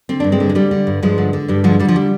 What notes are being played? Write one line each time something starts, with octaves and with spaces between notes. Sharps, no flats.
D3 C4
G2 D4
G#3 C4
D3
G#3
D3 G3
D3
G2
G2 F3 G#3
D3
D3
G2 G3
D3 F3 G#3
D3 G3
F3
G3